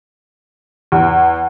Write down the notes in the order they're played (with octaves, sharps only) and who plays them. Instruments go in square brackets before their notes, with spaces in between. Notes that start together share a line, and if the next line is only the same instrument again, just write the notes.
[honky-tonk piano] E2